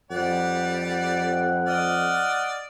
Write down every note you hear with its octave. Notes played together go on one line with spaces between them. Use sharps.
F2 G3 D5 F#5
F#5
D5 D#5 F6